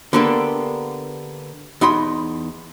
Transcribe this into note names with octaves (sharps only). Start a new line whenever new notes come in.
D3 A#3 B3 D4 G4 A4
E2 D#4 D#5 B5 C6